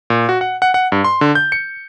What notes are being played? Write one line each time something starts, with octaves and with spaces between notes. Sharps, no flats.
A#2
F#4
F#5
F#5
F#5
G2
C6
D3
G6
C#7